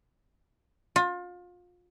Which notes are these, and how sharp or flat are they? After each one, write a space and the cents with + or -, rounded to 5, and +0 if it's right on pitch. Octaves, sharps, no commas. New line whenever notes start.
F4 +30